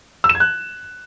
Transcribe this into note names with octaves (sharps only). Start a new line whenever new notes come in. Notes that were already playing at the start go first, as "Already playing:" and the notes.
E6
E7
G#6
F#6